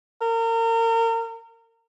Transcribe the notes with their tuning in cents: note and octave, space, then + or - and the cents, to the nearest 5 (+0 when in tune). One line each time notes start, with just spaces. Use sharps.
A#4 -35